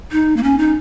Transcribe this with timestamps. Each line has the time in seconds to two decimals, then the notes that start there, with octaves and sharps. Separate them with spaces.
0.12 D#4
0.37 A#3
0.43 C#4
0.58 D#4